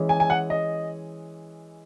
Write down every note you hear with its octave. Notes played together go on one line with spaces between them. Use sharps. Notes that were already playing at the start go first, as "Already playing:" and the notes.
Already playing: E3 G#3 C#4
G#5
G#5
F#5
D#5